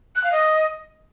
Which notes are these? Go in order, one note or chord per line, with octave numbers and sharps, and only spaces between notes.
F#6
F5
D#5